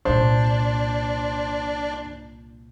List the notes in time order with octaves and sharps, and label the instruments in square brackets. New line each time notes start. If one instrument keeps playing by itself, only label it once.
[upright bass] C2 A#2 [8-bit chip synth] D4 [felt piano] C5